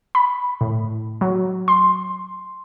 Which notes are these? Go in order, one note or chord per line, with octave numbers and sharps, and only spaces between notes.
B5
A2
F#3
C6